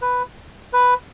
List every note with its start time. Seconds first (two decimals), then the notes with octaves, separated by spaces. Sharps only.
0.02 B4
0.73 B4